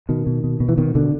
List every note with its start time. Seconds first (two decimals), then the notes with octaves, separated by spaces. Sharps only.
0.09 B2 D#3
0.27 B2
0.44 B2
0.60 B2
0.69 E3
0.77 B2 D#3
0.95 B2 D3